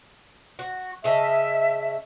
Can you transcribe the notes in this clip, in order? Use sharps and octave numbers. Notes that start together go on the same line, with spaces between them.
F#4
C#3 D#5 E5 A5